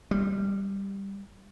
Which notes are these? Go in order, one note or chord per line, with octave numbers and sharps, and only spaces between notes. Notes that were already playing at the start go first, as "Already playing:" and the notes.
G3